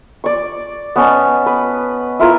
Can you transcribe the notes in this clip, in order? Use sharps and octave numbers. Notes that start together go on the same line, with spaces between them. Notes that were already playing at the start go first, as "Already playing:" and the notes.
D5 C#6
B3 C#4 D#5 A5
B4
E4 F4 A#4 B4